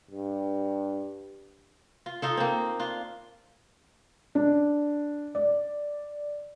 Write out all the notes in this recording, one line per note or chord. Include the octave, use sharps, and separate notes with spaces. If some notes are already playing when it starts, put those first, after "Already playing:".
G2
F4
D#4 F4 A4
A#3 C4
D4 F4
D4
D5